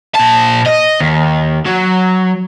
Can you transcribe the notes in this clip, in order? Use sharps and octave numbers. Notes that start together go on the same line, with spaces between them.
A#2 A5
D#5
D#2
F#3